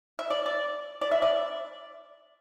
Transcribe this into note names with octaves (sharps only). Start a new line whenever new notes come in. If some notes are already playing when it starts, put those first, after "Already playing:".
E5
D5
D5
D5
E5
D5